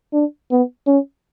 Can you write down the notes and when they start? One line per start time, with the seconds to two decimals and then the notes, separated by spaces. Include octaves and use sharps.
0.13 D4
0.51 B3
0.87 C#4